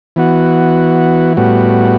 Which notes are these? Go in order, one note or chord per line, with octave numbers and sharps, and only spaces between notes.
E3 B3 F#4
A2 G3 B3 F#4